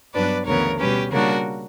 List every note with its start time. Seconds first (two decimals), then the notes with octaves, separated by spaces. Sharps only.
0.14 G2 F#3 B3 D4 B4 D5
0.46 D2 C#3 E3 B3 A#4 C#5
0.79 B2 G3 C#4 G4 B4
1.11 C#3 G3 A#3 D4 F#4 A#4